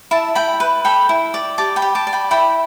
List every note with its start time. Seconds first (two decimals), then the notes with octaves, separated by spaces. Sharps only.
0.11 E4 E5 A5
0.35 E4 G5 B5
0.60 B4
0.84 A4 G5 B5
1.09 E4
1.34 D5
1.58 G4 A5 D6
1.76 G5 B5
1.82 G4
1.95 A5 D6
2.07 D5
2.13 G5 B5
2.31 E4 G5 B5